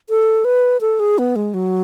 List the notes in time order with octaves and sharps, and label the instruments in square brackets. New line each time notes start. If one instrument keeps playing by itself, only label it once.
[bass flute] A4
B4
A4
G#4
B3
G#3
F#3